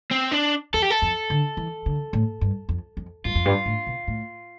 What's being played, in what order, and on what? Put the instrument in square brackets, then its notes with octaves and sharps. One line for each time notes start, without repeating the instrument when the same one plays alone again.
[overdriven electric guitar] C4
D4
[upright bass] E2 [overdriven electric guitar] A4
[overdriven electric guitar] G4
A4
[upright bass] F2
D3
E3
D3
A2
G2
F2
F2
[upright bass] G2 [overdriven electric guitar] F4
[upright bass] F2
G2
A2
B2
A2